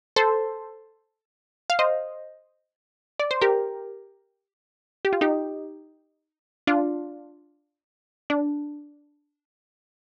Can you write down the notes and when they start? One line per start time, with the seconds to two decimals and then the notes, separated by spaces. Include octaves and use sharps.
0.16 A4 C5
1.70 F5
1.79 C5 D#5
3.20 D5
3.31 C5
3.41 G4 A#4
5.05 G4
5.13 F4
5.21 D#4 G4
6.67 D4 F4
8.30 D4